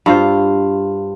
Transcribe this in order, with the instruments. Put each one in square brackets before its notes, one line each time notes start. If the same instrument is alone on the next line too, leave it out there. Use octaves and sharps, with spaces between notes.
[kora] G2 F4 C5